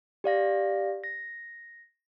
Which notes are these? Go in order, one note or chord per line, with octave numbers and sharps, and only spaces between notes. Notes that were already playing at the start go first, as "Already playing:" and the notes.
G4 D5 F5 A#6
A#6